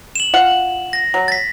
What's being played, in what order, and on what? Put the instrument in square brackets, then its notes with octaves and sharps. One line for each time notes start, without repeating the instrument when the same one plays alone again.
[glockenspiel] E7 F#7
[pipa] F4 F5 F#5
[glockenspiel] A#6
[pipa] F#3
[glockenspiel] A6 B6